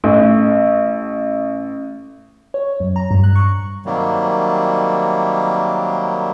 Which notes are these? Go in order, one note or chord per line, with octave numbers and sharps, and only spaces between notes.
A1 A3
C#5
F#2
A#5
G2
F#6
C#6
C3 D#3 F#3 G3 A#3